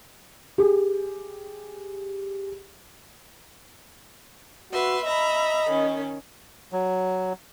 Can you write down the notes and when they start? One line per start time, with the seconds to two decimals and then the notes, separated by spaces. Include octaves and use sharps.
0.58 G4 G#4
4.72 F#4 B4 E5 C6
5.04 D#5 E5 A#5 B5
5.69 D#3 C#4
6.73 F#3